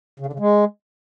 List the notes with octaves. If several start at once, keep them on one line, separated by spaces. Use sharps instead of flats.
C#3
D3
C#3
G#3